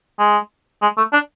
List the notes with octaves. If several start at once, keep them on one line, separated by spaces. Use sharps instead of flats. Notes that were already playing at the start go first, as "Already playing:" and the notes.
G#3
G#3
A3
D4